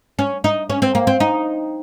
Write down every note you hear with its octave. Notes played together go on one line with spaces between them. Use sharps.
C#4
D#4
C#4
C4
A#3
C4
D#4